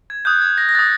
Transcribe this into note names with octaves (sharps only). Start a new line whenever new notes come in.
G#6
D#6 F#6 G6
G#6
A#6
A#6
D#6 F#6 A6